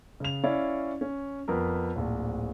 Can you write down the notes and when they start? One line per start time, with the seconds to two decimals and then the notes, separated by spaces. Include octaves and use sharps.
0.20 C#3 F7
0.44 C#4 E4 C#5 D5 F5
1.01 C#4
1.48 F2 B3 A#4
1.95 D1 A#1